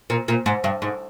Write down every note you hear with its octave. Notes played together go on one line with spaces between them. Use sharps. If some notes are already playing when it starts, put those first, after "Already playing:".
A#2
A#2
G#2
G2
G#2